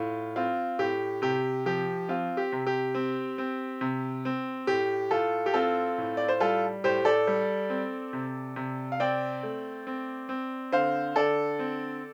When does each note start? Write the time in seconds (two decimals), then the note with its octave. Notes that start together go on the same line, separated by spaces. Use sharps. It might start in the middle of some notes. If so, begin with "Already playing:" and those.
Already playing: A2 F4
0.36 C4 F4
0.79 A2 G4
1.22 C3 G4
1.66 F3 G4
2.09 C4 F4
2.37 G4
2.52 C3
2.67 G4
2.95 C4
3.38 C4
3.81 C3
4.25 C4
4.67 A2 G4
5.11 A2 F4 A4
5.46 G4
5.54 C4 F4 A4
5.98 A2
6.17 D5
6.29 C5
6.40 G3 F4 A4
6.84 A2 G4 C5
7.05 A4 D5
7.27 G3
7.70 C4
8.13 C3
8.56 C3
8.92 F5
9.00 C4 D5 G5
9.43 A3
9.87 C4
10.29 C4
10.72 D3 C5 F5
11.16 D3 A4 D5
11.59 C4